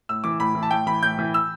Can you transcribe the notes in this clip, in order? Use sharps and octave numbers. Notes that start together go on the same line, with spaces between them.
A2 E6
E3 D6
A2 B5
E3
A5
A2 G5
E3 B5
A2 G6
E3
E6